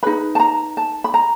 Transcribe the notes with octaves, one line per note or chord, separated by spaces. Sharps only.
D#4 G#4 B4 B5
A5
A#5
A5
B5
A#5